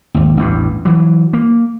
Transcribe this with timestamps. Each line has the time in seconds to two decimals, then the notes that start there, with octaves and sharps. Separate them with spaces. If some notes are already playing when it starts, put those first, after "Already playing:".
0.14 G#1 D#2
0.37 A1 E2 G2
0.85 E3 F#3
1.33 A#3